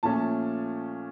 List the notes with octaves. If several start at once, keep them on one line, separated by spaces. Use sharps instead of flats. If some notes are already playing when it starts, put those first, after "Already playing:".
A#2 F3 A3 C#4 A5